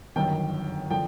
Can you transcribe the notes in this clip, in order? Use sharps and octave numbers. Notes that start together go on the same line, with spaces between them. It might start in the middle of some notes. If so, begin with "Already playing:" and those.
G1 F#2 D#3 G5
D3 F3 G5